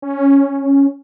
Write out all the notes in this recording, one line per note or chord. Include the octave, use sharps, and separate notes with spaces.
C#4